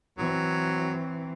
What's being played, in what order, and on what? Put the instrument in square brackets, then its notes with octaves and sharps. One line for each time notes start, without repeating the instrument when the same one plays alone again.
[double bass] E3 C4 [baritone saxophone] F#3